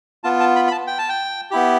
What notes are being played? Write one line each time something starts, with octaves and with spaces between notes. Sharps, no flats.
B3 F4 A5
A5
B5
B5
A5
G5
A5
G5
B3 E4 G4